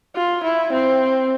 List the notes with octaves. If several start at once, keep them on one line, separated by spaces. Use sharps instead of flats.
F4
E4
C4